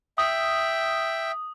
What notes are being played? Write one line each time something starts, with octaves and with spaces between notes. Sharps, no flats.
E5 G5 D#6